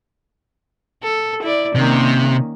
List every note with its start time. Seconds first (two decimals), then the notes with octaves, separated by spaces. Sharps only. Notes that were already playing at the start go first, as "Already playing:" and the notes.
1.03 A4
1.43 E4 D5
1.76 C3 D#3 A#3 C#4